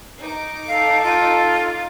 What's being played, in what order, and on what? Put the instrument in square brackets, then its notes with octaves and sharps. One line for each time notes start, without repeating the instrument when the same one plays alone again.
[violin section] D#4 D6
[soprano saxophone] A4 [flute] F5
[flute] F4